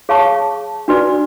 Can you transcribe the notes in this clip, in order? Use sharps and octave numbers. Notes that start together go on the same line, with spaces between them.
G#4 C#5 F5 A5 C#6
D4 F#4 B4 D5